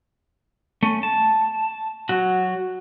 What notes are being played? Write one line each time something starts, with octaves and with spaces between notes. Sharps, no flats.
A3 C#4
A5
F#3 F#4